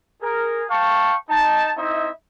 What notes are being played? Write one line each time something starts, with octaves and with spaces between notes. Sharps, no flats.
G#4 A#4
F5 G5 A5 C#6
D#4 A5
C4 D#4 E4 D#5 E5